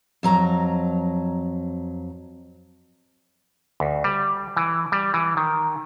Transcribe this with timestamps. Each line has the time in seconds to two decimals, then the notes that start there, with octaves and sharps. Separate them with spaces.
0.23 F2 F#3 A#5
3.80 D2
4.04 G3
4.57 E3
4.92 G3
5.14 E3
5.37 D#3